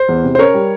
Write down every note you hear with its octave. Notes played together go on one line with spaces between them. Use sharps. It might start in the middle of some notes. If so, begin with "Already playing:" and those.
Already playing: C5
E2
C3
C5
C#4 A#4 C#5
G3